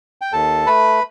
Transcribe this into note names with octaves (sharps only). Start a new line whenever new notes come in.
G5
D#2 A4 A5
A3 B4 B5